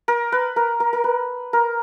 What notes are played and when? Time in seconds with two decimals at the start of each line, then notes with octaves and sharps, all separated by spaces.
0.08 A#4
0.32 B4
0.56 A#4
0.80 A#4
0.93 A#4
1.04 B4
1.53 A#4